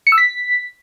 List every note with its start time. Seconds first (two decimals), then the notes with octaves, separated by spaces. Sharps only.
0.07 C#7
0.12 E6
0.18 B6